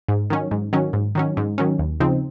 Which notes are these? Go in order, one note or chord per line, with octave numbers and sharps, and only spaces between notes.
G#2
D#3 F#3 C#4
G#2
D#3 F#3 C#4
G#2
D#3 F#3 C#4
G#2
D#3 F#3 C#4
D#2
C#3 F3 C4 D#4